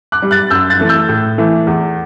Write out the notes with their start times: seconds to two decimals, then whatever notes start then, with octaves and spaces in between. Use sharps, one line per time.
0.12 D6 F#6
0.22 G3
0.31 F#6 A6
0.50 F#2 E6 G6
0.70 F#6 A6
0.79 E3 A3
0.89 E6 G6
1.09 A2
1.38 E3 A3
1.67 E2